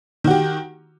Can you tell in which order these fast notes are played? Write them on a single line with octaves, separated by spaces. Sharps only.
D#3 F#4 G4